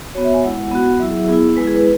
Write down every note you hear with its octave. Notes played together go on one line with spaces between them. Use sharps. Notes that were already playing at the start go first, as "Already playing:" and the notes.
B3 F#4 C#5
E5
G#5
G#3 E4 F#5
B3 F#4
F#3 E4 E5
G#4
B3 E4 G#4
G#3 E4 B4
G#4
B4